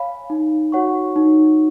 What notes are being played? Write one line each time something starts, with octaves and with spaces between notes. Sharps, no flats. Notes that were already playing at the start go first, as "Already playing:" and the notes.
Already playing: C#5 F5 G#5 B5
D#4
F#4 C#5 F#5 C#6
D#4